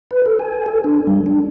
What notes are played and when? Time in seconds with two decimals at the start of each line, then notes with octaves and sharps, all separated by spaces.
0.11 B4
0.26 A4
0.39 G#5
0.66 A4
0.84 D4
1.07 G3
1.26 D4